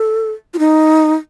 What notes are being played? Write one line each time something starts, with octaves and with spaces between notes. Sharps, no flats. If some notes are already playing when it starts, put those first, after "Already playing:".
Already playing: A4
F4
D#4